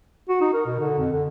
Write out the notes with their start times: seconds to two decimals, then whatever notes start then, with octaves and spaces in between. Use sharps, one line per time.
0.29 F#4
0.41 D#4
0.54 A#4
0.66 B2
0.79 D3
0.98 F2
1.12 D3